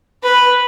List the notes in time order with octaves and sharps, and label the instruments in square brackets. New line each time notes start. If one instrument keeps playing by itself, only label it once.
[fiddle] B4